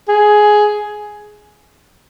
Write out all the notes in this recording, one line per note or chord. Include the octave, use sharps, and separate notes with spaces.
G#4